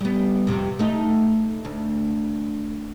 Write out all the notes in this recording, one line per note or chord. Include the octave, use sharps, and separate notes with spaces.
G3 B3
F2 C3
A3 D#4
D2